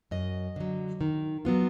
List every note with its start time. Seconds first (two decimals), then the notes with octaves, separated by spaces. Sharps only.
0.11 F#2 D#5
0.56 D3 F#3
1.01 D#3
1.45 F#3 B3 F4